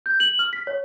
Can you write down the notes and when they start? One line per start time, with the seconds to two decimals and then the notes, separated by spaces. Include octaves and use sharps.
0.06 G6
0.20 F#7
0.39 F6
0.53 B6
0.67 C#5